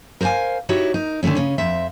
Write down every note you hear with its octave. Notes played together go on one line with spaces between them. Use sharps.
A#4 C5 D5 F5 G#5
D#4 E4 F#4 G4 C#5
D#4 A#4
D3 D#3 F#3 A3 C#4
C#3 C#4
F2 C4 E5